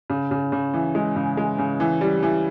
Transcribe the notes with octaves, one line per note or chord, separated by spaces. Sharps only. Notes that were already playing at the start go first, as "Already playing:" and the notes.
C#3
C#3
C#3
E3
G#3
C#3
G#3
C#3
E3
G3
E3